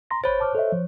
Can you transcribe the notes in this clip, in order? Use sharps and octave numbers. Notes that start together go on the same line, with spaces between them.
A#5 C6 A#6
G#1 C5 C#5 B5 A6
A5 D6 F6
A4 D#5 E5
F3